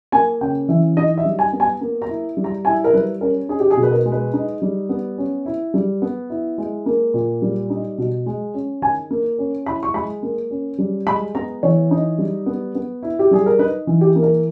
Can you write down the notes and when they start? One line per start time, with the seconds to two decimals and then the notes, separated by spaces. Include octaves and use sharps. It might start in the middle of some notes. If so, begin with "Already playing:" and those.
0.12 A#3 G#5
0.41 C#3 G5
0.69 E3 E5
0.97 D#4 D#5
1.17 E5
1.25 G3
1.39 G#5
1.53 B3
1.60 G#5
1.81 A#3
2.02 A#5
2.09 E4
2.37 G3
2.44 A#5
2.65 E4 G#5
2.84 A#4
2.93 G3 B4
3.21 C#4 A#4
3.49 D#4 G#4
3.60 G4
3.70 G#4
3.77 B2
3.83 B4
3.91 A#4
4.06 G#3
4.12 B4
4.33 D#4
4.62 G3
4.89 B3
5.18 C#4
5.46 E4
5.74 G3
6.02 B3
6.30 E4
6.58 G#3
6.86 A#3
7.14 A#2
7.42 G3
7.70 D#4
7.98 B2
8.26 G#3
8.54 C#4
8.82 D#3 G#5
9.11 A#3
9.38 C#4
9.66 E4 B5
9.83 C#6
9.94 G#3 B5
10.23 A#3
10.51 C#4
10.78 G3
11.07 G#3 B5
11.35 B3 A#5
11.63 E3 C#5
11.91 D#4
12.18 G3
12.46 B3
12.75 B3
13.03 E4
13.19 G4
13.31 G3 G#4
13.46 A#4
13.59 D#4 B4
13.87 E3
14.01 G4
14.16 A#3
14.22 A#4